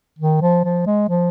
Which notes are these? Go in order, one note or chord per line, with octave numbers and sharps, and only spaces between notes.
D#3
F3
F3
G#3
F3